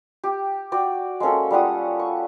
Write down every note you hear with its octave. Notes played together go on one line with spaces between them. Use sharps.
G4
F#4 D5 G5
G#3 A#3 C#4 A4
G3 F4 F#5 D#6
C#6